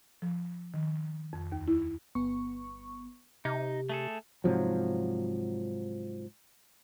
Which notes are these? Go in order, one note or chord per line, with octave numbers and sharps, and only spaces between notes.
F3
D#3
F2
D#2
E4
G1 B3 C#6
C3 D#4
A3 G#4 A4
G#2 C3 F3 F#3